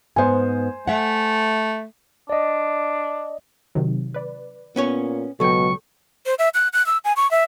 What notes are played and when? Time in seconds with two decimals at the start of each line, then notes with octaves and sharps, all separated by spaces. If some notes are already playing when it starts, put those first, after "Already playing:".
0.16 G#2 B3 C5 G#5
0.88 A3 E5 F#5
2.30 D4 D5 D#5
3.75 C3 D#3 F#3
4.14 B4 D5
4.76 A#2 B3 C#4 C#5
5.40 C#2 B2 F#3 A4 G5 C#6
6.26 C5
6.39 E5
6.54 F#6
6.73 F#6
6.86 E6
7.05 G#5
7.17 C#6
7.31 E5